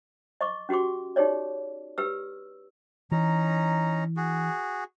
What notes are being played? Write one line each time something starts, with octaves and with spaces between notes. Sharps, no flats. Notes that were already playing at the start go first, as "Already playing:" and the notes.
D#5 C#6 D6
C#4 F#4 G4 C6 D6
D#4 G4 G#4 C#5 D5
G4 B4 E6
E3 C#4 D#4 A#5
F#4 G#4